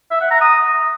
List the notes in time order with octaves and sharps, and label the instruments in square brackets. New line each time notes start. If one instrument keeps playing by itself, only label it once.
[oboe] E5
F#5
A#5
D#6